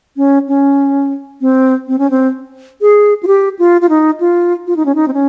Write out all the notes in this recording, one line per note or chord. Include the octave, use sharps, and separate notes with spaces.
C#4
C#4
C4
C4
C#4
C4
G#4
F4
G4
F4
F4
D#4
F4
F4
D#4
C#4
D#4
C4
C#4